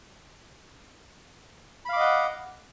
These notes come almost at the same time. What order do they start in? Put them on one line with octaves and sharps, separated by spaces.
B5 F5 D6 D#5 F#5